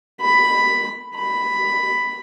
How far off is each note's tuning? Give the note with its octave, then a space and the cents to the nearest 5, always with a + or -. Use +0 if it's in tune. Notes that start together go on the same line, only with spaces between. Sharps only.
B5 +5
B5 +5